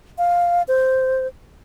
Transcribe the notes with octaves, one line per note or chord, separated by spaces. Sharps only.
F5
C5